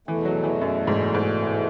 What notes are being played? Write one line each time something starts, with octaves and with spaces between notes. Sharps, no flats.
E2 B2 E3 A3
F#3
E3
F#2
G#2
G#2
A2